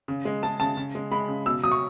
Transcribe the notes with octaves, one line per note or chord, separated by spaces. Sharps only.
C#3
G#3
G#3 A5
C#3 A5
C#3
G#3
G#3 B5
C#3
B2 E6
F#3 D#6
C#6